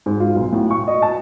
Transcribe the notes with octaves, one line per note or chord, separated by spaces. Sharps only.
G#2
F4
B1
A2
C#6
D#5
A5